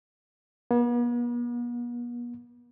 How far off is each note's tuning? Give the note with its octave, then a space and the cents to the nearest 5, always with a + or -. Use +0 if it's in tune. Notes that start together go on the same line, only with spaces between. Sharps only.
B3 -45